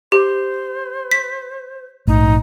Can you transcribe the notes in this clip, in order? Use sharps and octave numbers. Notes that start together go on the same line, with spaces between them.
G4 C5
B6
A#1 G#2 A3 D#4